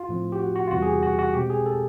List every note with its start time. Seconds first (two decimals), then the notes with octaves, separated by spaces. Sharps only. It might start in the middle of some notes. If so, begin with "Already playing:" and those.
Already playing: F4
0.09 A2 F3 A3 C4
0.32 G4
0.39 F#4
0.55 F#4
0.67 F4
0.71 E2 C3 E3 G3 F#4
0.82 G#4
0.87 G4
1.03 F#4
1.19 F#4
1.34 B2 G#3 C4 G4
1.50 G#4
1.66 A4